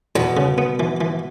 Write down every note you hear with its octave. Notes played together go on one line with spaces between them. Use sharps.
E2 B2
C#3
B3
E3
E3